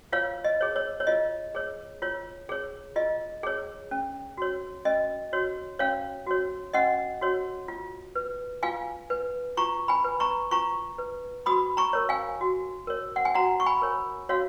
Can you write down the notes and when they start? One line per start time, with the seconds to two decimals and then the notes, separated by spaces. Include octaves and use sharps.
0.12 F4 C#5 F5
0.44 D#5
0.61 G#4 C#5
0.76 C#5
1.00 C#5
1.07 F4 D#5
1.55 G#4 C#5
2.02 F4 C#5
2.49 G#4 C#5
2.96 F4 D#5
3.43 G#4 C#5
3.91 C#4
4.37 F#4 C#5
4.85 C#4 D#5
5.33 F#4 C#5
5.79 C#4 C#5 F5
6.26 F#4 C#5
6.73 C#4 D#5 F#5
7.21 F#4 C#5
7.68 F4
8.15 B4
8.63 F4 F5 G#5
9.10 B4
9.57 F4 A#5 C#6
9.88 G#5 B5
10.04 B4
10.20 A#5 C#6
10.51 F4 A#5 C#6
10.98 B4
11.46 F#4 B5 D#6
11.77 A#5 C#6
11.93 A#4 C#5
12.09 F5 G#5
12.41 F#4
12.87 A#4 C#5
13.16 F#5
13.25 G#5
13.34 F#4 F#5 A#5
13.60 C#6
13.66 G#5 B5
13.82 A#4 C#5
14.29 F#4 C#5 F5